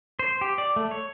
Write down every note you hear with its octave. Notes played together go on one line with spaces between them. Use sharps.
C5
G4
D5
A3
C#5